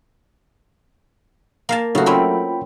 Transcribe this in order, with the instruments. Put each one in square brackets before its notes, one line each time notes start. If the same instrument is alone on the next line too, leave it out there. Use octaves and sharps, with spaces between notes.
[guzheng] A#3 F5 A5
[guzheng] C#3 F#4 [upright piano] F#3 A3 A#4
[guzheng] C4 C#4 E4 [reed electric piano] F4 G5 B5